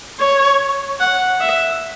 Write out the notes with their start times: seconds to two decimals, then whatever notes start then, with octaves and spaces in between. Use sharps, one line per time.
0.20 C#5
1.00 F#5
1.41 E5